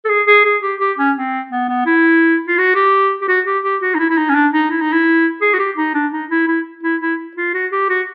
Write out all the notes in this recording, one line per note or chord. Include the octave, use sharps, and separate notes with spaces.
A4
G#4
G#4
G#4
G4
G4
C#4
C4
B3
B3
E4
F4
F#4
G4
G4
F#4
G4
G4
F#4
D#4
E4
E4
D#4
C#4
D4
D#4
E4
D#4
E4
G#4
F#4
G4
D#4
D4
D#4
E4
E4
E4
E4
F4
F#4
G4
F#4